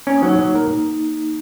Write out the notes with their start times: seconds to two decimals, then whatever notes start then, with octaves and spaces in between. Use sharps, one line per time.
0.07 A#3 C#4
0.18 D#4
0.23 F#3
0.29 D#4
0.39 F#3
0.55 A#4